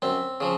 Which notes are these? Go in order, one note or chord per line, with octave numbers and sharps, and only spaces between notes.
F#2 C4
C#3 F3